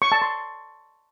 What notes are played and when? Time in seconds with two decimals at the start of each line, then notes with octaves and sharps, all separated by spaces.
0.02 C#6
0.12 A5
0.22 C6